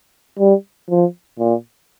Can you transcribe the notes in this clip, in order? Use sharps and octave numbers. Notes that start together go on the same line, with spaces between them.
G3
F3
A#2